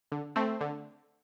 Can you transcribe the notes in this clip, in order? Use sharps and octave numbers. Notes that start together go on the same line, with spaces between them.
D3
A3 C4
D3